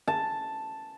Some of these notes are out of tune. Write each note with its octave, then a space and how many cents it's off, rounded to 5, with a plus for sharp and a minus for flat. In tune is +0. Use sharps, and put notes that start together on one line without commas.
A5 +0